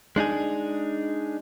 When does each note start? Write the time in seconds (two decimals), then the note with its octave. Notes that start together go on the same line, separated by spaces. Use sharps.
0.16 G#3 D4 D#4 G#4